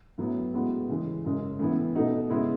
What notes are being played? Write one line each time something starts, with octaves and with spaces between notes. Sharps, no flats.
A2 F#3 B3 E4
A2 G#3 B3 F#4
C#3 E3 G#3
F#2 C#3 G#3
A2 E3 B3 E4
B2 A3 D#4 F#4
C#3 G#3 B3 E4